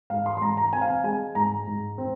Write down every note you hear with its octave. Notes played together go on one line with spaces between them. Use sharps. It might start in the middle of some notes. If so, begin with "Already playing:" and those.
G#2 F5
C6
C6
G#2 A#5
A#5
C4 G#5
F5
G#5
G#3 G#5
G#2 A#5
G#2
C4